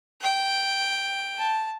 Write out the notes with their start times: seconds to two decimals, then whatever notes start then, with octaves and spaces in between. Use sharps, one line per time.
0.21 G5
1.38 A5